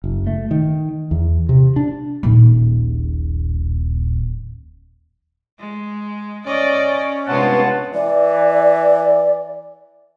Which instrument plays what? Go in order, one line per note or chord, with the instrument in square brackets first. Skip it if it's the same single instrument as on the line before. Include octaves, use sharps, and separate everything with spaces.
[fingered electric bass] F#1
A3
D#3
E2
C3
D4
[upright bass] D#1 A#1
[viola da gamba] G#3
[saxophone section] C#4 [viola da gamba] D5 D#5
[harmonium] G2 B3 C#5 [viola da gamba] C3 G#3 F4 [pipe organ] F#5 A5
[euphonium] E3 [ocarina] D5